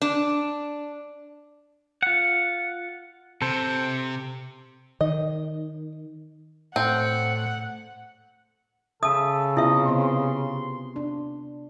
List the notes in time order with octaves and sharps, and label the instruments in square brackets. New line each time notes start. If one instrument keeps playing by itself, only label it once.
[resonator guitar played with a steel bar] D4
[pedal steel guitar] F4 F#5
[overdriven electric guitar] C3 [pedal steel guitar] A4 C5
[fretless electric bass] D#3 [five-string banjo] D#5
[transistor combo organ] A2 [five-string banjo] C4 [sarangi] F#5
[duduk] C#3 [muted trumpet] A4 [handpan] E5 [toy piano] A5 D#6
[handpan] C3 B3 F4 [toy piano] E4 E5 [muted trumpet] D#5
[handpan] C3 B3 C4 [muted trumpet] C6
[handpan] D4